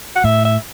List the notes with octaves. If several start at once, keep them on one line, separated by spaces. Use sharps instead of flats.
F#5
A2 E5
E5